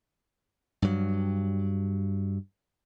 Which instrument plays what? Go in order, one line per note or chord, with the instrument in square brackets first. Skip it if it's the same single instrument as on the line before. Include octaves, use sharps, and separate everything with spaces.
[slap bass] G2 F#3